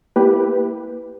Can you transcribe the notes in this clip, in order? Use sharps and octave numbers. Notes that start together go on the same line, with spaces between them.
A#3 E4 G4 B4